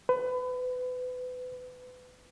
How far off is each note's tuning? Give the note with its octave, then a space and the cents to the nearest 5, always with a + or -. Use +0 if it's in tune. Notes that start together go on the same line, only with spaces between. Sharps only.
B4 +30